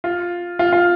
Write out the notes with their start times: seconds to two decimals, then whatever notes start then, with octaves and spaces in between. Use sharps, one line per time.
0.04 F4
0.59 F4
0.73 F4